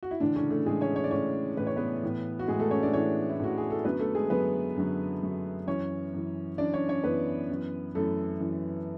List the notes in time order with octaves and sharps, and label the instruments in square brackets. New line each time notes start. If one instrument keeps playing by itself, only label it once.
[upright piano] F#4
E4
A2 D3 E3 D4
C#3 C#4
A3
A2 E3 G#3 G#4
C#4 C#5
C#5
D5
A2 E3 C#4 C#5
A2 E3 B4
C#5
B3 B4
A2 E3
F#4
A2 E3 G#3 G#4
A3 A4
C#4 C#5
D4 D5
A2 E3 C#4 C#5
E4
A2 E3 F#4
G#4
A4
F#2 D3 F#3 B3 B4
A3 A4
G#3 G#4
F#2 D3 F#3 B3 B4
F#2 D3 F#3
F#2 D3 F#3
F#2 E3 C#4 C#5
F#2 E3
F#2 E3 D4 D5
C#4 C#5
C#4 C#5
F#2 E3 B3 B4
F#2 E3
F#2 E3 A3 A4
F#2 E3